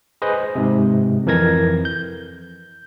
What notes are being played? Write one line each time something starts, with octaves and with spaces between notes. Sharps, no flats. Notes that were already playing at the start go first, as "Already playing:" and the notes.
G#4 B4 C5 D#5
G#2 C3
F2 E3 A#4 G#6 A#6
G6